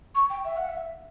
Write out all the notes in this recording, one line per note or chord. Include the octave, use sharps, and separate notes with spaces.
C#6
G5
E5
F#5
E5